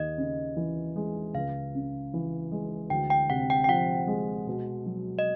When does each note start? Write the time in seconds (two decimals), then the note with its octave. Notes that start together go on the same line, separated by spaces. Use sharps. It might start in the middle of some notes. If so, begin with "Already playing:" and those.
Already playing: D#2 D#5
0.18 C#3
0.56 E3
0.96 G#3
1.34 C#2 F5
1.75 C#3
2.14 E3
2.51 G#3
2.90 D2 G5
3.10 G5
3.30 C3 F#5
3.50 G5
3.64 G5
3.68 F3 F#5
4.07 G#3
4.47 B2
4.86 F#3
5.19 D#5